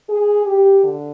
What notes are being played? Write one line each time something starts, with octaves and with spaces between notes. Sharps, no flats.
G#4
G4
D3